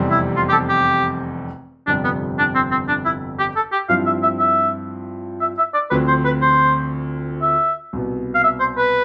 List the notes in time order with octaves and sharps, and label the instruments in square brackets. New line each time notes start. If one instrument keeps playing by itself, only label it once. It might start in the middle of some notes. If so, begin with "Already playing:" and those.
Already playing: [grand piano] F1 E2 C3 G3 C4
[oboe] E4
F4
G4
A4
G4
[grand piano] G1 F2 C3 G3 [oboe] D4
[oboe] B3
D4
C4
C4
D4
E4
G4
A4
G4
[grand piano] G2 F3 C4 E4 [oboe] F5
[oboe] E5
E5
E5
E5
E5
D5
[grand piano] D2 D3 F3 C4 [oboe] B4
[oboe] C5
B4
C5
E5
[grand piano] C2 B2 B3
[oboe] F5
E5
C5
B4